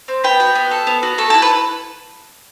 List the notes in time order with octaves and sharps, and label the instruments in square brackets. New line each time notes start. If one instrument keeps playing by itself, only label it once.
[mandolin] C4
B3 G5
F#4
B3
A4
B3
F#4
A3 A4
A4
E4
B4